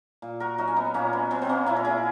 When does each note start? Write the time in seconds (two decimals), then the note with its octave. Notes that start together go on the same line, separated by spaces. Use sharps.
0.22 A#2
0.40 F#4 A#4
0.58 F#3 D#4 F#4
0.67 C#4
0.76 B3 D#4
0.94 A#2 A#3 C#4
1.13 B3
1.31 F#3 B3
1.42 B3
1.49 A#3 C#4
1.66 A#2 C#4 E4
1.76 A#4
1.85 E4 G#4